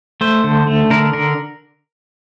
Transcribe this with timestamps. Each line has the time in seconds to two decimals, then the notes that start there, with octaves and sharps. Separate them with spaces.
0.21 A3 C5
0.44 D3
0.67 A3
0.90 D3 A#4
1.13 D3 A#4